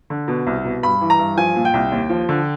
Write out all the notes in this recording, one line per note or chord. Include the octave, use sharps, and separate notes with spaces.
D3
B2
C2
B2
G2 B5
E3
A#5
G2
F3 G#5
A#2
G5
C2
D#2
F3
D3